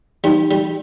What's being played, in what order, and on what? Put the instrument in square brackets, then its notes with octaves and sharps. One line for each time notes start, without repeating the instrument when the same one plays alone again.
[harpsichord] G3 [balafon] D#4
[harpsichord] G3